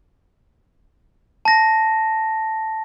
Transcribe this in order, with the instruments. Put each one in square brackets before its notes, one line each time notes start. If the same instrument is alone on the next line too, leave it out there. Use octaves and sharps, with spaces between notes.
[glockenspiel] A5 A#6